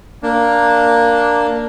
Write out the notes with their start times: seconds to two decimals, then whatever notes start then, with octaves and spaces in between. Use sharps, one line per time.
0.23 A#3 D4